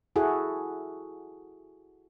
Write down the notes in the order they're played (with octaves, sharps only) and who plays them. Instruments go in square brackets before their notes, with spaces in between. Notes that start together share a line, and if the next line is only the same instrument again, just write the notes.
[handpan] E4 F#4 G#4 A4 F#5